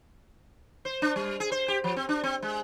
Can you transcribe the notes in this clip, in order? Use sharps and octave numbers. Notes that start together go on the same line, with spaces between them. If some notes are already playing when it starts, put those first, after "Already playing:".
C5
D4
G3
G#4
C5
G4
F3
C4
D4
C4
G#3